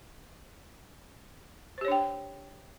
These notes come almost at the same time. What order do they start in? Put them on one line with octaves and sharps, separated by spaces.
C5 G4 C#5 D4 G5